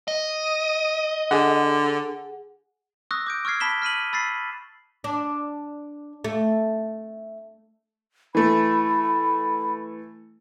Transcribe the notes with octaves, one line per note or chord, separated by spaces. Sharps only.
D#5
D3 G#4 F#5
C#6 D#6 E6 F#6 A#6
D6 G6 D7
C#6 E6 F6 G#6 C7
A5 B5 B6 E7 G7
F6 B6 D#7 F#7
B5 E6 A6 B6 C7
D4
A3
E3 A3 B5